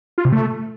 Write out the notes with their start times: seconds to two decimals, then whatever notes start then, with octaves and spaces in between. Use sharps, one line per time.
0.18 F4
0.25 C3
0.32 A3